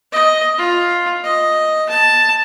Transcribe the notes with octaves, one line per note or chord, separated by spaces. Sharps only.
D#5
F4
D#5
A5